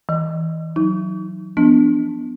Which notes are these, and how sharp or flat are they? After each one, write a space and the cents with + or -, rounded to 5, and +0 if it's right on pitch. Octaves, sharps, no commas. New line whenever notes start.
E3 -25 D#5 +0
F#3 +0 D#4 +25
F3 -15 B3 +0 D4 +0